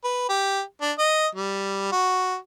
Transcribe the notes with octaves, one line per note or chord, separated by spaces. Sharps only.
B4
G4
D4
D#5
G3
F#4